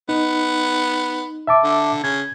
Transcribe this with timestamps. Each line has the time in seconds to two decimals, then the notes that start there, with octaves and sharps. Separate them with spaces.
0.09 B3 D#4
1.47 E5 A5 D6
1.64 D3
2.04 C#3 G#6